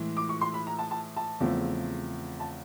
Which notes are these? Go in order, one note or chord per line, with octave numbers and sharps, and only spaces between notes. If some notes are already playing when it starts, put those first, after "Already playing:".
Already playing: A2 E3 G#3
D6
C#6
C6
B5
A#5
A5
A5
A5
E2 C#3 F3 A3 C4
A5